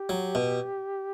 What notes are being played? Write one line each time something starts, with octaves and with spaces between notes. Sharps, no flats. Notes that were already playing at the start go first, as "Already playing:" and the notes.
Already playing: G4
F#3
B2